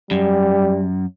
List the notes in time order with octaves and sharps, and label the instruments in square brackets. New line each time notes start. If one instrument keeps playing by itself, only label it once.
[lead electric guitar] F#2 [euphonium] G3